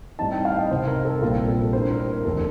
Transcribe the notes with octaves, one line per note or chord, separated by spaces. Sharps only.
A2 G3 C4 D#4 A5
G5
F5
D#5
C2 C3 D#3 C5
A#4
A4
A#1 A#2 G3 C4 F4
A4
A#4
A2 G3 A#3 D4 C5
A#4
A#4
F1 D#2 D3 F3 A4